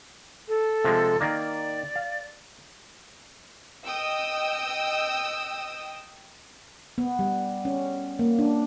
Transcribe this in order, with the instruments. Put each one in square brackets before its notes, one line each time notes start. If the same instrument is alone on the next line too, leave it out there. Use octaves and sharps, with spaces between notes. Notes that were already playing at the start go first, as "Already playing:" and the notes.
[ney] A4
[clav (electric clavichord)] C3 F3 G#3
[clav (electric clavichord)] D#3 A#3 [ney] D5
[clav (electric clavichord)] F5
[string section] D#5 G5 D#6 E6
[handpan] B3
G3
C#4
A#3
D4